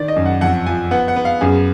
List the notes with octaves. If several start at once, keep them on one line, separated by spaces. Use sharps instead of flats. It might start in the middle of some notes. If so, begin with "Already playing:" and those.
Already playing: D#3 D5
D#5
F#2
F#5
F2 F#5
F3 G#5
B3 F#5
F#5
B3
F5
F#2 G#4